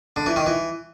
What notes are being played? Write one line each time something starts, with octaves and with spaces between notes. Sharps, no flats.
D3
E3
D#3
E3